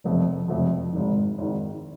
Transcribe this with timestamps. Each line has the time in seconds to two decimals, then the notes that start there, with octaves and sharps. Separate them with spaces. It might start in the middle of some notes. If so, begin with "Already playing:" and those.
0.04 F1 F2 C3 F3
0.48 F1 F2 C3 F3
0.93 G#1 G#2 D#3
1.38 G#1 G#2 D#3